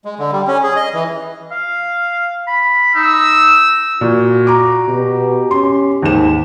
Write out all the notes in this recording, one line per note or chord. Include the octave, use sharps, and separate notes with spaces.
G#3
D3
G3
C#4
G#4
D#5
E3
F5
B5
D#4 E6
A#2 F#4
A#5 D6
B2 G4
C#4 C6
D#2 G#2 E7